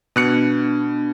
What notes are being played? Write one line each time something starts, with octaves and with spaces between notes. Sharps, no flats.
B2 B3 D4 F#6 C#7